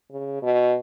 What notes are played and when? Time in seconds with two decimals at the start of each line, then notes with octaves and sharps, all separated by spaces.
0.11 C#3
0.42 B2